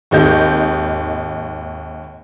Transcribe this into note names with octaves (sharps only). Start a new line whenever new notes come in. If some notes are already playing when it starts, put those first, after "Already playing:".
G#1 D#2 D#5 G6